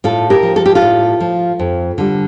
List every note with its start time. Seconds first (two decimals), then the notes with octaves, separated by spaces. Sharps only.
0.04 A2 F4 A4
0.30 G4 A#4
0.43 F3
0.56 A4
0.66 G4
0.75 F4 A4
0.82 A2
1.20 F3
1.59 F2
1.98 D3 G3